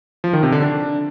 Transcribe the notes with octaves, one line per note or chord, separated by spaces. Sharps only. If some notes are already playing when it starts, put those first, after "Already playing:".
F3
D#3
C3
D3
D4